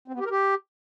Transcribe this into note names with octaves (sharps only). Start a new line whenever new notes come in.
C4
B3
G4
A#4
G4